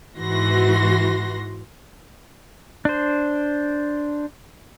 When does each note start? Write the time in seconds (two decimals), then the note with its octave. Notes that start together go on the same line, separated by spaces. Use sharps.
0.17 G#2 E3 F#4 C6 A#6
2.85 D4 C5